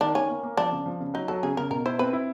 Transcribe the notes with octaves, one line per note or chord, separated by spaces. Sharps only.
D#3 D4
D#3 C#4
A#3
A#3
F3 D4
C#3
F3
C#3
F#3 D#4
F#3 A4
C#3 G#4
C#3 A#4
B2 A#4
E4 C5
C4 B4
E4